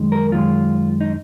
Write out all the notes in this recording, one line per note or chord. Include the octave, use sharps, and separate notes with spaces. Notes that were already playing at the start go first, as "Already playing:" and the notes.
Already playing: F#2 D#3 G#3
A#4
F#2 D#3 G#3 F4
D#4